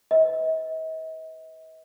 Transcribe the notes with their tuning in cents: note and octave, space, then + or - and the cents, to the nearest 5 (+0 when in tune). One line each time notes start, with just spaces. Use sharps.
B4 +20 D#5 +45